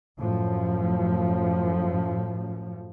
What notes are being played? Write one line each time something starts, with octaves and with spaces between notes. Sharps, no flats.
F#2 A2 F3